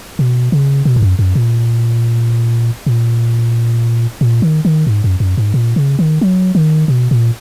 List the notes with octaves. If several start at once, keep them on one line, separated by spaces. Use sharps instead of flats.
B2
C#3
B2
G#2
F#2
F#2
A#2
A#2
A#2
D#3
D#3
G#2
F#2
F#2
G#2
A#2
C#3
D#3
F#3
D#3
B2
A#2